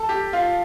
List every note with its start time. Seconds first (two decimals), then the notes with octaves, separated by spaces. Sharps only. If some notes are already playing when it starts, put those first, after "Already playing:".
Already playing: A4
0.09 G4
0.33 F4